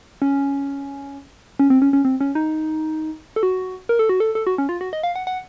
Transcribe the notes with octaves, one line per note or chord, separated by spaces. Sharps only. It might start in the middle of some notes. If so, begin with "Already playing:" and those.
C#4
C#4
C4
C#4
C#4
C4
C#4
D#4
A4
F#4
A#4
A4
F#4
A4
A4
F#4
C#4
F4
F#4
D#5
F5
F#5
F#5